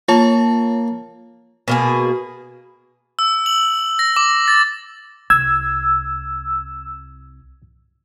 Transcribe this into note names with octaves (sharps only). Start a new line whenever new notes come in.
A#3 F4 C#5 A5
B2 A#3 G#4
E6
F#7
A#6
D6
A6
C2 E6 G#6